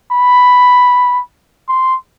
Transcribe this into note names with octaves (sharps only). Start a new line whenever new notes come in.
B5
C6